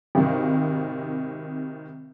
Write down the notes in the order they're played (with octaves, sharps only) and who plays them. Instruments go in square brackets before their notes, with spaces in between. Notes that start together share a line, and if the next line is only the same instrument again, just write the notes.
[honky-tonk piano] G#1 C3 D#3